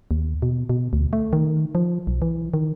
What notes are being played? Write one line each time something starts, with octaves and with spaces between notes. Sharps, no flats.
D#2
B2
B2
D2
A3
D#3
F3
B1
E3
D#3